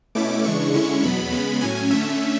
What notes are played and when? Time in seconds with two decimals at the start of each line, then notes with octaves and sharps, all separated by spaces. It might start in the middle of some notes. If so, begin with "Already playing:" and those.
0.15 B2 A3 C#4 E4 D6
0.44 C#3 E3 G#3 D4 C#6
0.74 D3 G#3 C#4 E4
1.03 E2 B2 F#3 B3 B5
1.33 C#3 G#3 B3
1.61 A2 F#3 C#4 G#5
1.91 D3 A3 C#4 E5